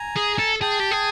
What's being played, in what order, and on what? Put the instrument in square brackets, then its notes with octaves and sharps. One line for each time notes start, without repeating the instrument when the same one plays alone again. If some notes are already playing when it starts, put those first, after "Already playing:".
Already playing: [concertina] G#5 A#5
[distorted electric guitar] G#4
A4
[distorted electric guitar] G#4 [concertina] G5 A5
[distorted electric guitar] G4
G#4